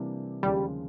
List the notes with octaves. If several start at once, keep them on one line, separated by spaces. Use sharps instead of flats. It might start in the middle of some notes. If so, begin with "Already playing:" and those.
Already playing: C3 E3 G3 A#3 D4
D#2 C#3 F3 G3 G#3